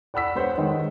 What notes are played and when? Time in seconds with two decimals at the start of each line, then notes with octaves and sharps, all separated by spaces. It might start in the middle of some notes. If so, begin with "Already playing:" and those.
0.14 D5 F#5 B5 E6 B6
0.35 B3 C5 C#5 F#5
0.58 D#3 G#3